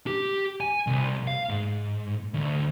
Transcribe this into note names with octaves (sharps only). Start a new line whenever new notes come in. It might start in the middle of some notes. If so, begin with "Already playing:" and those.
G4
G#5
C2
F5
G#2
D2